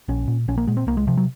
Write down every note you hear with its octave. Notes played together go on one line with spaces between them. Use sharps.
A#1 C#4
A#2
A#1 C#4
A#3
A#2 G#3
C4
C2 A#3
G#3
C3 F3
F#3